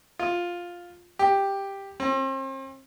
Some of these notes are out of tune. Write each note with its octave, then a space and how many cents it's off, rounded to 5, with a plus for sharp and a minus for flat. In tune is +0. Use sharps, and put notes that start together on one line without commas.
F4 +5
G4 +5
C4 +40